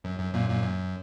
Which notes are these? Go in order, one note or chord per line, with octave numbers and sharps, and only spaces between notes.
F#2
F#2
F#2 A#2
F#2 A#2
F#2